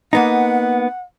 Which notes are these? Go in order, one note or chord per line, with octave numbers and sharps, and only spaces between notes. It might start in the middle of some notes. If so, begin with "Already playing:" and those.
A#3 B3 D#4 F#5